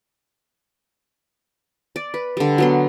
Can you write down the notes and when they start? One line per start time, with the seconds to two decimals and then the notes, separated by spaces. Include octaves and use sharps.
1.96 D5
2.14 B4
2.37 D3 G3
2.58 F#3 B3 C6